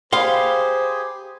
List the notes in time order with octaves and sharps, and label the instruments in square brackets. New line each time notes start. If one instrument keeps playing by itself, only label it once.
[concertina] G4 G#4 [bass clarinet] C5 [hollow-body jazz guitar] F5 C6 [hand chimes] G5 B5